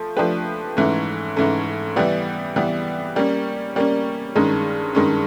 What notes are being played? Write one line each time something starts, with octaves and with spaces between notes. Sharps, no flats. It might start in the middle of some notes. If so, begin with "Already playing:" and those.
Already playing: F3 A3
F3 A3 D4 G4 B4
G#2 E3 A3 C#4
G#2 E3 A3 C#4
E3 G3 B3
E3 G3 B3
G3 A#3 C#4
G3 A#3 C#4
G2 D#3 G#3 C#4
G2 D#3 G#3 C#4